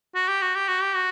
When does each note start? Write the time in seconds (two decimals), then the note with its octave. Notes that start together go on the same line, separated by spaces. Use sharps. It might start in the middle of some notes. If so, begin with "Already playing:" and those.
0.15 F#4
0.28 G4
0.42 F#4
0.55 G4
0.68 F#4
0.82 G4
0.96 F#4